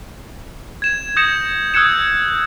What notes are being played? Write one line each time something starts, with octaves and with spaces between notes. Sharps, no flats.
G#6 E7
D#6 G6 A#6 C#7 E7
D#6 E6 F#6 G#6 C#7 E7